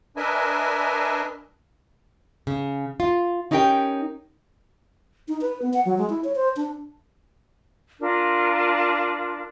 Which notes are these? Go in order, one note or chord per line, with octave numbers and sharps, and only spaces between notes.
D4 A#4 B4 D#5 E5 G#5
C#3
F4
C#4 D#4 E4 G4 A#4 G5
D#4
B4
B3
F#5
F#3
G#3
E4
C#5
C5
D4
D4 F4 A#4